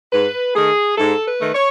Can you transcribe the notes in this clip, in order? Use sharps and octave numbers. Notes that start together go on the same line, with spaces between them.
G#2 B4
D#3 A3 G#4
G#2 A4
B4
D#3 A3
C#5